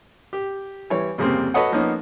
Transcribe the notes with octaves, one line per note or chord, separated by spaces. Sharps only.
G4
E3 G3 C#5
C2 F2 C#3 G3 A#3 C4
F#4 A4 B4 C#5 D#5 F#5
F3 A#3 B3 C#4 D#4